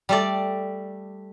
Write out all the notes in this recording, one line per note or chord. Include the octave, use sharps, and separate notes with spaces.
G3 A3 D5